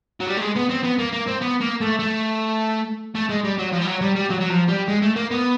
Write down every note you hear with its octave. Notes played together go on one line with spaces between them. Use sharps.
F#3
G3
A3
G#3
B3
C4
B3
A#3
A#3
C4
B3
A#3
A3
A3
A3
G#3
G3
F#3
F3
G3
F#3
G3
G3
F#3
F#3
F3
G3
G#3
A3
A#3
B3